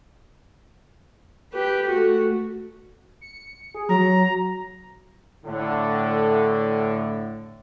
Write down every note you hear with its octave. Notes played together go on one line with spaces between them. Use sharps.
G4 B4
A3 F#4
C#7
G#4
F#3 A#5
A2 D3